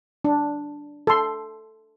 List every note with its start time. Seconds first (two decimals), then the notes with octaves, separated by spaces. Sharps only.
0.24 D4
1.07 A4 C6